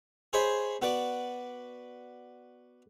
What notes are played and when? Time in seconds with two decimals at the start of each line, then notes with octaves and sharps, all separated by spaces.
0.33 G#4 C5 C#5 D#5 B5 D#6
0.82 B3 F#4 B4 D5